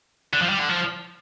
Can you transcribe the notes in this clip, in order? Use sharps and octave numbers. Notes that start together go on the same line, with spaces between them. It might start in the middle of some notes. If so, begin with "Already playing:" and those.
D3
F3
G3
D3
F3